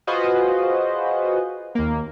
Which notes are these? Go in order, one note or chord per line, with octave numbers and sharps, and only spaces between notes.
F4 F#4 G#4 B4 C5 D#5
D#2 A#3